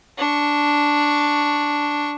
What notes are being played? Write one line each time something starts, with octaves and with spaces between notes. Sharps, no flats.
D4 C#6